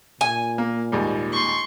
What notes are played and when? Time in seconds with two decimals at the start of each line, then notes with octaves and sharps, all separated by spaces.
0.21 A#2 G#5
0.58 A#3
0.92 D#2 G#2 G3
1.33 C6 C#6